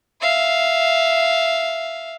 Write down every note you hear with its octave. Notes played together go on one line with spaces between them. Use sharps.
E5 F5